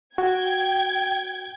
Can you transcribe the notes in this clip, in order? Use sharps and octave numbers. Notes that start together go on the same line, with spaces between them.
F#4 G5 G#6